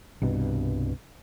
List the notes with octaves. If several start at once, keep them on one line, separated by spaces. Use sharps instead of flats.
C2 G2 B2